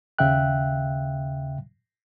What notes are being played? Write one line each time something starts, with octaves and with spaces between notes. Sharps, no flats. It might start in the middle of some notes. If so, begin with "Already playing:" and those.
D#2 C#3 E5 F5 G5 F#6